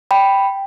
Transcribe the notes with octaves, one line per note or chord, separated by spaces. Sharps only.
G5 B5